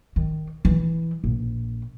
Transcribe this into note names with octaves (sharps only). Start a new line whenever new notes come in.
D#3
E3 E4
A#1